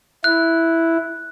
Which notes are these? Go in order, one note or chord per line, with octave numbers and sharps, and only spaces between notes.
E4 F#6